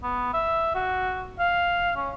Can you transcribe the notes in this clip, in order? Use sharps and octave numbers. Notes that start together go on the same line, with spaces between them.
B3
E5
F#4
F5
C#4